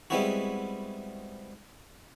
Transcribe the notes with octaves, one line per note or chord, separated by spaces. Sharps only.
G3 G#3 B3 C4 E4 F#4